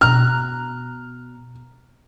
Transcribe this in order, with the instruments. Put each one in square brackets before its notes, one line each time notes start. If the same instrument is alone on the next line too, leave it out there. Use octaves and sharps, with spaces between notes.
[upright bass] B2 B3 [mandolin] A#5 F#6 [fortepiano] F6